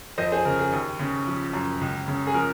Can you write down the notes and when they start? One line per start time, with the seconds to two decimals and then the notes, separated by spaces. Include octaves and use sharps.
0.18 F2 C5 D#5
0.32 G#4 C5
0.45 C#3 A#4
0.59 G#4
0.72 D#2
0.99 C#3
1.27 F3
1.53 F#2
1.81 C#2
2.08 C#3
2.27 G#4
2.34 F3 A#4